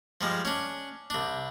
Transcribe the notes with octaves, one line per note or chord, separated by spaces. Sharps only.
F3 G3 G#3
C#4 D4
C2 D4